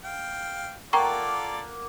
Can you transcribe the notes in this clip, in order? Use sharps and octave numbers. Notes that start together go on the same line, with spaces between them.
F5 G5
A#3 F4 A4 D5 F#5 G5 A#5 C#6